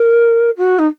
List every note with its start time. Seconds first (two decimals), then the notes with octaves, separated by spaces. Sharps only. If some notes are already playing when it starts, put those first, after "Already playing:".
Already playing: A#4
0.57 F#4
0.78 D#4